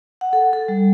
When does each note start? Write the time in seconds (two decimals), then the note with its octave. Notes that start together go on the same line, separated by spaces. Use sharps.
0.21 F#5
0.33 A4
0.53 A4
0.68 G3